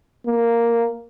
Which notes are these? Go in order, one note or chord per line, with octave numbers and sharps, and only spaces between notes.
A#3